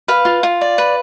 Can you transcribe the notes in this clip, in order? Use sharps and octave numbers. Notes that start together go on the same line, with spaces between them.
B4 F5
F4
F4
D5
B4